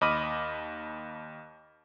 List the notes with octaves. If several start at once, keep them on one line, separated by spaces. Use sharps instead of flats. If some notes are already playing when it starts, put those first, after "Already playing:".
D#2 D#5 B5 D6 F6 D#7